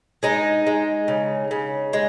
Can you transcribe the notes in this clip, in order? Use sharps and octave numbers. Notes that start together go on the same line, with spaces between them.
G#3 D#4
G#3
C#3
C#3
G#3